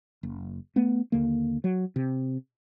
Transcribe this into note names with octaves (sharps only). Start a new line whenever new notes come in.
F#1
A3 B3
D#2 D3 A#3
F#3
C3